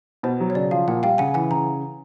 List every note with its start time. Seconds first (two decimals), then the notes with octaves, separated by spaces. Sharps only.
0.23 B2 C5
0.40 F#3
0.50 C#5
0.55 C#3 D5
0.71 F3 F5
0.88 A#2 F#5
1.03 G3 F5 G5
1.18 C#3 F#5 G#5
1.34 E3 F#5 G#5
1.50 C#3 G#5 A#5